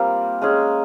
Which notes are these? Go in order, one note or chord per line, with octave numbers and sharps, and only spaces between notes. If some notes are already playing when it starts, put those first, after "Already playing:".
Already playing: G3 A#3 C4 F4 G4 A#4
G#3 C#4 G#4